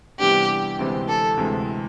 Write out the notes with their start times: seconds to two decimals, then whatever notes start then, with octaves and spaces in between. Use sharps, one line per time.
0.19 C3 E3 G3 B3 D4 G4
0.79 D2 C3 E3 G#3 C4
1.09 A4
1.38 D2 C3 E3 G#3